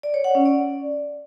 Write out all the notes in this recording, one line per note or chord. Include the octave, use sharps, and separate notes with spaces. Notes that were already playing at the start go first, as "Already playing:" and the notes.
D5
C#5
F#5
C#4
D5